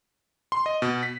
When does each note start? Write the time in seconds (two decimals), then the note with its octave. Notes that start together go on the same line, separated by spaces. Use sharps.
0.52 C6
0.66 D#5
0.82 B2
1.03 B6